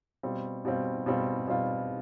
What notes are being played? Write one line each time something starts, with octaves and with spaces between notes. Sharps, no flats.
B2 G3 C4 F4
B2 G3 C4 F4
B2 G3 C4 F4
B2 G3 C4 F4